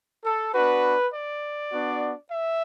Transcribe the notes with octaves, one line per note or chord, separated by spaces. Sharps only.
A4
B3 D4 F#4 B4
D5
B3 D4 F#4
E5